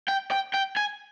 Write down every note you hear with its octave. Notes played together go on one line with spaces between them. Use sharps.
G5
G5
G5
G#5